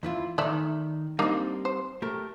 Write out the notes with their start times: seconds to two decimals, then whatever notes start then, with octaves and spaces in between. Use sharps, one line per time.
0.03 E2 E4 F4
0.38 D#3 A3 D#4 D5 E5
1.19 G3 A#3 C4 D4 D#4
1.65 C5
2.02 A3 G4 A#4